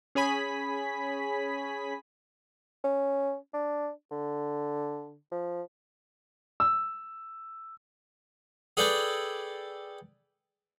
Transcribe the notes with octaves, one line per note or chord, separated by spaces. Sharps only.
C#4 G#4 C#5 G#5 B5 B6
C#4
D4
D3
F3
E6
G#4 A4 B4 D5 G5